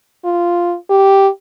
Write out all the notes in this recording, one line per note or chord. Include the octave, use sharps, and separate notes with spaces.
F4
G4